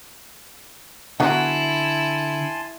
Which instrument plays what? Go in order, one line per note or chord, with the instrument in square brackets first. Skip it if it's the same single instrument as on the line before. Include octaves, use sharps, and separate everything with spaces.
[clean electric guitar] D3 [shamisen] F#3 B3 [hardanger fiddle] E4 [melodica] G#5 A5 C6